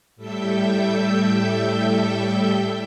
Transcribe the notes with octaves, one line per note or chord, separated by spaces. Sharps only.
A2 G3 A4 E5 G5 G6